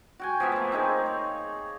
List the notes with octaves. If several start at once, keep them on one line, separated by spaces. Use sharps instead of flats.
F#4 G5 G#5
F3 B3 E5
A3 A#3
C4 D#4 G#4
C#5